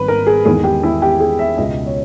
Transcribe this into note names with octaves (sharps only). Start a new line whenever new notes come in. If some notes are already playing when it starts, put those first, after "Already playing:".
Already playing: G#1 G#2 G3 B4
A#4
G#4
E2 D#3 G#3 G#4
G4
E4
G4
G#4
E5
C#2 B2 G#3 D#5
C#5